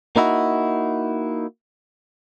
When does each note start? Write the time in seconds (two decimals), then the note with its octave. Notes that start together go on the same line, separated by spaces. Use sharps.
0.16 A#3 D#4 E4 F#4